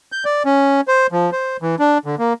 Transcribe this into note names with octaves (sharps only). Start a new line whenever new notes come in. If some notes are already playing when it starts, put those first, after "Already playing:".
G6
D5
C#4
C5
F3
C5
E3
D4
D3
A#3